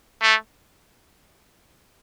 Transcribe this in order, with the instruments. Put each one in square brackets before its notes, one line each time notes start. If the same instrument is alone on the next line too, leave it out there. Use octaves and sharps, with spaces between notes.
[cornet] A3